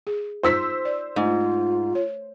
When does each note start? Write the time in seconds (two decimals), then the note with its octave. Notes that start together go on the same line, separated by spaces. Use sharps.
0.07 G#4
0.43 D#4 F4 C5 E6 B6
0.85 D5
1.16 G#2 A3 F4
1.95 C#5